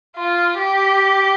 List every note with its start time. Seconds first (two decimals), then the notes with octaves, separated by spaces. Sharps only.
0.16 F4
0.58 G4